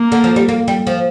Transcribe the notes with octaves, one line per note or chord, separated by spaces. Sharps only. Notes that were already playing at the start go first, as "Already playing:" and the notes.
Already playing: A#3
D3
F3
G3
A#3
G3
F3